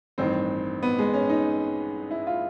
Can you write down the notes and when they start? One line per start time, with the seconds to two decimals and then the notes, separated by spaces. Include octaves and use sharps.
0.18 A1 G2 D#3 C4
0.83 B3
0.99 G#3
1.14 C#4
1.30 D#4
2.11 E4
2.27 F4